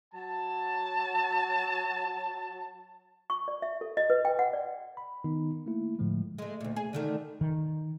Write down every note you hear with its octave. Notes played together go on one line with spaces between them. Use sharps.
F#3 A5
C#6
D5
E5
A4
D#5
B4
G5
F#5
D5
B5
D#3 B3 D#4
A3 A#3 E4
A2 D3 F3 G#3 A3
G#3 A3
D2 A#2
G#4
D3 D#3 A3
D#3